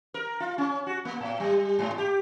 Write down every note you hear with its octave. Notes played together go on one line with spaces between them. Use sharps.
A#4
F4
C#4
F#4
A#3
A2
G3
G#2
G4